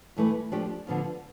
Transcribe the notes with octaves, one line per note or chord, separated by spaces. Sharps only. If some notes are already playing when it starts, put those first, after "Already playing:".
G2 E3 A3 E4 B4
F3 A3 D4 G4
D3 F3 B3 F4